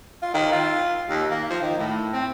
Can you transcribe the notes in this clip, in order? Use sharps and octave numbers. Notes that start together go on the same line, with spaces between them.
F4
D#3
F4
D#2
A#3
F3
D#3
A2
C4